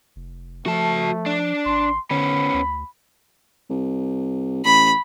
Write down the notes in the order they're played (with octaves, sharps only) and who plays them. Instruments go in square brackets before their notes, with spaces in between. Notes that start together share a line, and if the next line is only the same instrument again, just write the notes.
[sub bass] F1
[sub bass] F3 [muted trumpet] A3 [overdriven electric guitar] F#4 A5
[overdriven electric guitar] D4
[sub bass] G#1 [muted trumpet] C6
[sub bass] D3 [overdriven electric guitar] B3 C#4 [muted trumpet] B5
[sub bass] D2
[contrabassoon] C2
[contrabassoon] A1 [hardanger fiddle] B5